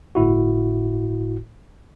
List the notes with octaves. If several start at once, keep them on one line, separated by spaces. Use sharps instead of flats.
G1 A2 E4 F#4